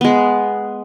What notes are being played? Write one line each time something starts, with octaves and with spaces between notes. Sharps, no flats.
G#3 B3